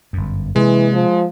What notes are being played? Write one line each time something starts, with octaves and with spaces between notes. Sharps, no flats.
G1 F#2
C3 E3 G#3 A#3
F3